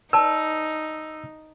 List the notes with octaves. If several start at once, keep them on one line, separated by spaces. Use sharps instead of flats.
D#4 B4 D5 A5 E6